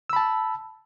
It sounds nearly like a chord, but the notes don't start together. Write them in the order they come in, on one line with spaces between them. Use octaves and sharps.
E6 B5 A5